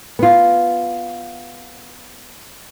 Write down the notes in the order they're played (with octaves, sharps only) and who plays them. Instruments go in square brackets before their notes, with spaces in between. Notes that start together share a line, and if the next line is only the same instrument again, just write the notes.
[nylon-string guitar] B3 F4